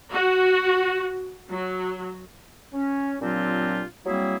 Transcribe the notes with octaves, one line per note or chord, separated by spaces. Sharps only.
F#4
F#3
C#4
A#2 F#3 C4 D4 F4 G4
F#3 G3 A#3 C4 E4 G#4